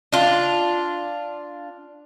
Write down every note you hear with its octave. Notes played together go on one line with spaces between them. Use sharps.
D4 F4